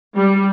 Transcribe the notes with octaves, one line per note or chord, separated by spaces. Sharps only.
G3